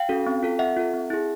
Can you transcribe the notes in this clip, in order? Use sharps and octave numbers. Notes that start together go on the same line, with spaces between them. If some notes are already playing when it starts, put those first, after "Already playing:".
Already playing: F5 G5
C#4 F#4 A4
C4
F4 A4
C4 E5 F#5
F4 A4
C4
E4 G#4